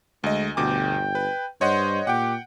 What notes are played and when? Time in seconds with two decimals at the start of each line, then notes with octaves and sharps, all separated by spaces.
0.24 D2 G#3 D#5
0.57 G1 D2 B2 G5 D6
1.15 B4
1.61 G2 C5 C#5 D#5 F#5
2.07 A#2 G4 F#5 G5